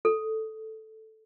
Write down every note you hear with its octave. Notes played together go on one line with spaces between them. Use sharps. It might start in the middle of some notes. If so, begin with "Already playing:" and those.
A4